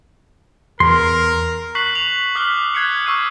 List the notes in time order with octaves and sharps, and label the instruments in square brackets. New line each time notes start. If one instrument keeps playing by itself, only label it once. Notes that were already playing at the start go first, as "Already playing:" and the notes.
[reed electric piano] E2 [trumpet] A#4 [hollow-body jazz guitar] C6
[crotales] C#6 F#6 B6 C7 F#7
F7
D6 D#6 F6 F#6 B6 G7
F#6 G#6 C7 C#7
C#6 E6 F#6 C7 D#7